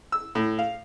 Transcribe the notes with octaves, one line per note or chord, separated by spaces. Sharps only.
E6
A2
F5